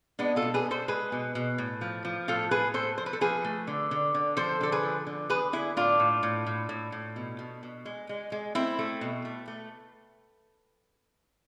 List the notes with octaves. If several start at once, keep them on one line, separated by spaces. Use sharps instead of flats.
G#3 B3 D4
F4 A4
B2
G#4 B4
B2
A4 C5
G#3 G#4 B4
B2
B2
A2
F3
F3
A2 F4 A4
A2 G#4 B4
A2 A4 C5
F3 C5
B4
A4
F3 G#4 B4
A3
D3
D3
D3
F3 A4 C5
D3 A4
G#4 B4
F3
D3
D3 G#4 B4
D3 E4 G#4
A2 D4 F4
A2
A2
A2
A2
A2
B2
B2
B2
G#3
G#3
G#3
A3 C4 E4
A3
B2
A3
A3